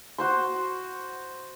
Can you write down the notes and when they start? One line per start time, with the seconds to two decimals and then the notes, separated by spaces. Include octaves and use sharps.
0.18 F#4 C5 C6